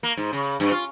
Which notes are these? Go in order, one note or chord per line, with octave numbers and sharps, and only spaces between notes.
A#3
G#2
C#3
G2
F4